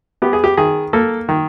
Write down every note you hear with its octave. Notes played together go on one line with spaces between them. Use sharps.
B3 G4
G#4
G4
D#3 G#4
A#3 A4
D#3